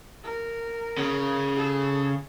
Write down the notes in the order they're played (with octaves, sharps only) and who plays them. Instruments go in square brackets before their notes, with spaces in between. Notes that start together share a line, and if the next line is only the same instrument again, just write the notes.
[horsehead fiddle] A#4
[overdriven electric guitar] C#3
[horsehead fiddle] G#4 A4